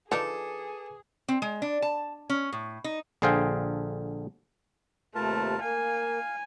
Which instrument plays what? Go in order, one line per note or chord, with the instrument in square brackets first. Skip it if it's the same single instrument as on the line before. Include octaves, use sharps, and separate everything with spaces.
[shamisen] F3 D4 D#4 [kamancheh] G#4 [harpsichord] A4 [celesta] B4 D6
[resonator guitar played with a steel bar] C4
G#3
D4
A5
C#4
A2
D#4
[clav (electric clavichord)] A#1 D3 G#4 C5 F5 G5
[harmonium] D#2 C3 B4 [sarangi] A3 [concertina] F4 A#4 A5
[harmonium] A#3 [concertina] F5 [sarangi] G#5